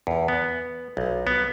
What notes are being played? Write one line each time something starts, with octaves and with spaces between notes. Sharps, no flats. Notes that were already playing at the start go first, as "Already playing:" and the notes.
E2
B3
B1
B3